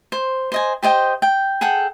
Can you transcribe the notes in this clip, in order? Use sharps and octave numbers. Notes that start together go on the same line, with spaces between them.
C5
C5 D#5 G#5
G4 C5 D#5 G5
G5
G#4 A4 F#5 G5